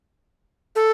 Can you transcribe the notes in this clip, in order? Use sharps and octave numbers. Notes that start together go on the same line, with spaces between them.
A4